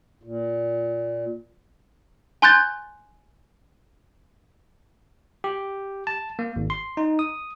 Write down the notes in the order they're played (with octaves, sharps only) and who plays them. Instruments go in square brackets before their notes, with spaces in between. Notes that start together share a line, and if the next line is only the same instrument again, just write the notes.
[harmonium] A#2
[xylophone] G#5 C6 F#6 G6 A6
[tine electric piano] G4
A5
A#3
G#1
C6
D#4
D#6